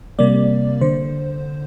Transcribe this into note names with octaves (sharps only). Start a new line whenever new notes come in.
C3 G3 A#3 D5
D3 C5